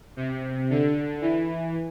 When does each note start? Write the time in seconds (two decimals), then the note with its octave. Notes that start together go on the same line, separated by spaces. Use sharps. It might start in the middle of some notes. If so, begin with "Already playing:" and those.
0.17 C3
0.70 D3
1.21 E3